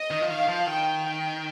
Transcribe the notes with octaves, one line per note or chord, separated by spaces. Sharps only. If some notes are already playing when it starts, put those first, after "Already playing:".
Already playing: D#5
D#3
F3
D#3 F5
F3
D#3 G5
G5